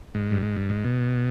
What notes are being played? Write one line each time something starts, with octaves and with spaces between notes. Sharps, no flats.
G#2
G2
G#2
G2
G#2
B2